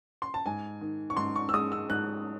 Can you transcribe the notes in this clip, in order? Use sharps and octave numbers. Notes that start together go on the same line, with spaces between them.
C6
A5
G#2 G#5
D#3
C#6
G#2 C6
C#6
E6
G#3 D#6
E6
G#2 F#6